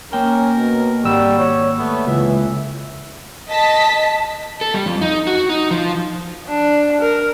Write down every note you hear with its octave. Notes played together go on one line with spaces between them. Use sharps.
A#3 C#4 A#4 G5
B2
G#1 G3 F#4 E6
C#5
A3 B3
C#2 E3 E5
D#5 A5 B6
A4
G3
F2
D#4
F#4
D#4
F3
D4
A#4